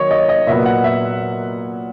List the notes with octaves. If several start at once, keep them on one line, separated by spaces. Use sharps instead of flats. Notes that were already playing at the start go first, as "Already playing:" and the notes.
Already playing: D#3 F#3 A#3 C#5 D#5
D#5
D#5
A#2 F#3 B3 E5
F#5
E5